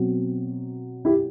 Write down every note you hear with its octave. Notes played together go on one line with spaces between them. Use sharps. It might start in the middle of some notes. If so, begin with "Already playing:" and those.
Already playing: B2 F#3 C4
E4 G4